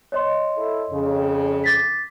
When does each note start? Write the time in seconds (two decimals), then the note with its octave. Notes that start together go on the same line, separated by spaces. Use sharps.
0.12 C#5 D#5 C6
0.57 E4 A4
0.90 F2 C#3
1.64 D6 A6 B6